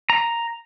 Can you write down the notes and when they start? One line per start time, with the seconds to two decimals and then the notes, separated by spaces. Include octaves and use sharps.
0.10 A#5